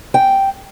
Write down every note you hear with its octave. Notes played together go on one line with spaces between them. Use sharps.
G5